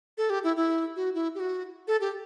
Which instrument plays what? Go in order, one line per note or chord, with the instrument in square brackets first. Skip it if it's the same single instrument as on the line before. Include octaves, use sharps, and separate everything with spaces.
[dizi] A4
G4
E4
E4
F#4
E4
G4
F#4
A4
G4